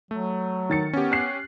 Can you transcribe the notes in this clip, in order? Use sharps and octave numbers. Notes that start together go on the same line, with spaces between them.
F#3 A3
D#3 A6 C#7
B3 C#4 G4
F#6 C7